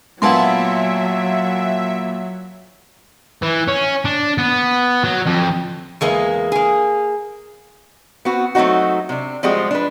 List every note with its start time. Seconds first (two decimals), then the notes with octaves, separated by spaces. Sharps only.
0.22 A#2 F#3 A#3 B3 E5 F#5 A5 C6
3.42 E3
3.68 C#4
4.05 D4
4.38 B3
5.04 F#3
5.27 F2
6.01 E2 G#3 A#3
6.52 A#3 G#4
8.25 B3 C4 F#4
8.55 F#3 A3 C4 D#4 F#4
9.09 C3 D4
9.43 F3 G3 G#3 C4 F#4 G#4
9.71 D4 B4